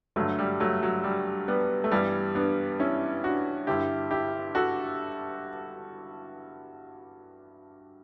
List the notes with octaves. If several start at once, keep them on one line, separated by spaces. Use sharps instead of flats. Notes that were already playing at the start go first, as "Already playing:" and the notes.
G2 D3 F#3 A3
G3
F#3 A3
F#3
G3
G3 B3
A3
G2 E3 G3 B3
B3 D4
C#4 E4
D4 F#4
G2 D3 E4 G4
E4 G4
F#4 A4